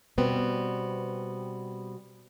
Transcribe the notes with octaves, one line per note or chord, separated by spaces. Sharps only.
B2 G3 B3 C4